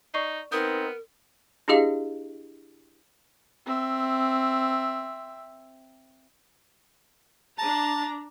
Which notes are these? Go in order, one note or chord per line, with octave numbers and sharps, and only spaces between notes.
D#4 D5 C#6 C7
B3 C4 D#4 A#4 D#6 G6
D4 E4 G4 G#4 D#5 F5
C4 E5
D4 A5 A#5